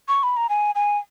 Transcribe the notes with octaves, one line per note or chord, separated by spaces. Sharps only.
C#6
B5
A#5
G#5
G#5